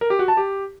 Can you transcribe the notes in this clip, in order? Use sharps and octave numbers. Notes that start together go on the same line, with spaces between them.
A#4
G4
F#4
A5
G4